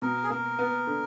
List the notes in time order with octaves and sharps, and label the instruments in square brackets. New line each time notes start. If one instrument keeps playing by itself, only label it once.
[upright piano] B2 [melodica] A#4
[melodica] G#4
[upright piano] A#3 [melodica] A#4
[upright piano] B3
D3